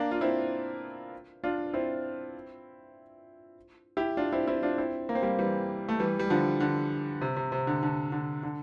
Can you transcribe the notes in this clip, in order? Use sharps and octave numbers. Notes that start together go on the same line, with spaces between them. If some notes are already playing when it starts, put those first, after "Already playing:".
Already playing: A#3 D4
F4
C4 E4
D4 F4
C4 E4
E4 G4
D4 F4
C4 E4
C4 E4
D4 F4
C4 E4
A#3
C4
G3 A#3
E3 G3
A3
E3 G3
G3
D3 F3
D3
C3
C3
C3
D3
D3
D3
D3